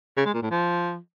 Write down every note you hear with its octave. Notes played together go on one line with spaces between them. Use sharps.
C#3
G#3
A#2
A2
F3